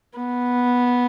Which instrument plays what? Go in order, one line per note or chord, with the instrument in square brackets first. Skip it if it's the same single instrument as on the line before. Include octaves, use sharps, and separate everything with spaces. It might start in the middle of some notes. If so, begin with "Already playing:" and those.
[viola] B3